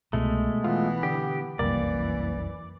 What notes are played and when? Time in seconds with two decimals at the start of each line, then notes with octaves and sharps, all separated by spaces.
0.13 C2 B2 G#3 A3
0.64 E3 B3 F4
1.03 D3 G4
1.59 F1 C2 F#2 E3 A#3 D5